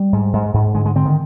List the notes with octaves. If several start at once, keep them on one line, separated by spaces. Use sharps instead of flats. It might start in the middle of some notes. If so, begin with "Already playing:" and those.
Already playing: G3
G#2
G#2
G#2
D3 G#3
G#3
D3 C4
D#3